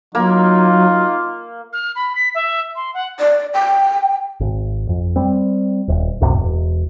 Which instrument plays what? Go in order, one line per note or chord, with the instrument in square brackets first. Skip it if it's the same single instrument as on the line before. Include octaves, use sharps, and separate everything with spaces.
[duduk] F#3 [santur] A#3 [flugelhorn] D#4 [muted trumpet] F4
[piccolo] F6
B5
B6
E5
C6
F#5
[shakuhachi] D5
G5
[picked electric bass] G#1
F2
G3 C4
D#1
C2 F#2 A2 C3
E1